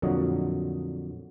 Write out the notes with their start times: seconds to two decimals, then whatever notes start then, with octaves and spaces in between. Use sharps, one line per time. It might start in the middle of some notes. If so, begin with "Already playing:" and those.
0.02 F2 A#2 D3 F#3 F#4 D#5